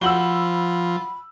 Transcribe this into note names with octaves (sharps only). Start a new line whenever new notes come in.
F3 F#4 C5 F#5 B5 E6 F#7 G7